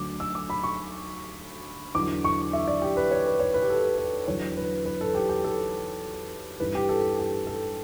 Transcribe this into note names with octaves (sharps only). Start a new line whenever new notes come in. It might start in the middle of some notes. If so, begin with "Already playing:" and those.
Already playing: D2 D3 F#3 D6
E6
D6
B5
C#6
E2 D3 F#3 D6
C#6
E5
D5
G4
B4
C#5
B4
C#5
B4
G4
A4
B4
E2 D3 F#3 C#5
B4
B4
A4
G4
G4
A4
G2 E3 B4
G4
A4
G4
A4